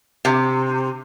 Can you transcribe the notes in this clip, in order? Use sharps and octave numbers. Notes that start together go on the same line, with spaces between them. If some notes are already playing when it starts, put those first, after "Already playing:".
C3